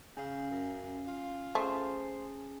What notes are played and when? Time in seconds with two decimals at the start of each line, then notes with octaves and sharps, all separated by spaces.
0.17 C#3 C#4 F5
0.50 F#2
1.08 F4
1.55 A3 C#4 G#4 C5 A5